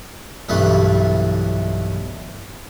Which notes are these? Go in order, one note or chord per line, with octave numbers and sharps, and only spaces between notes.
B1 G2 E3 A3